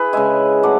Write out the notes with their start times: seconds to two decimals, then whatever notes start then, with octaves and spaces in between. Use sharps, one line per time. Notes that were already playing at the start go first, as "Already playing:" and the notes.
Already playing: E4 G#4 B4
0.13 C#3 G#3 E5 G#5
0.63 F#3 A3 D5 F#5